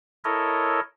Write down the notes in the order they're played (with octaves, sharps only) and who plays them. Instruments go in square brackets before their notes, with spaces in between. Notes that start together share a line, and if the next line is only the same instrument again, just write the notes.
[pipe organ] E4 A4 A#4 C#5 D#5